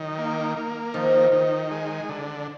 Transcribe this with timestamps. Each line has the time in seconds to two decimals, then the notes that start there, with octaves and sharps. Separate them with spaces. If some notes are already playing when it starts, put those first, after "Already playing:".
Already playing: D#3 F#3
0.18 A#3
0.57 A#3
0.94 D#3 F3
1.32 D#3
1.71 G#3
2.09 D3